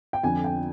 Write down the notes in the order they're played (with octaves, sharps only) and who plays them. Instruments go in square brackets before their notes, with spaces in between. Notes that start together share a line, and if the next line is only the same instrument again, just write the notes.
[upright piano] G5
F2 D3 F3 G#5
G5